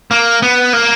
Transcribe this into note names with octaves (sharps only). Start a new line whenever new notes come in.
A#3
B3
A#3